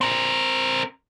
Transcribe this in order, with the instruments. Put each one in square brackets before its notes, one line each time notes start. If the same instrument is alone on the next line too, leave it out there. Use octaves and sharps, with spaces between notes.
[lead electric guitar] C4 A#4